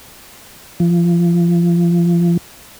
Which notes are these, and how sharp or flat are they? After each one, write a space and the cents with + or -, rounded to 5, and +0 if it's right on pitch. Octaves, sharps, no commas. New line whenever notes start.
F3 -25